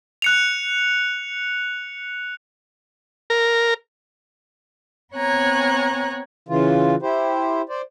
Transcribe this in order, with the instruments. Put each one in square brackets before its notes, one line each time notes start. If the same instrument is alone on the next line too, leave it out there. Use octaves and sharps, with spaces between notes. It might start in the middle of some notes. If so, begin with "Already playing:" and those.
[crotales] F#6 C#7 F7
[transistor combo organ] A#4
[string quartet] B3 C4 C#5 G#5 A#5 F#6
[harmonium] C#3 E3 F4
E4 G4 C5
C5 D5